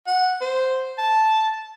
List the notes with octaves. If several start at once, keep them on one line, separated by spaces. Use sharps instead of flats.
F#5
C5
A5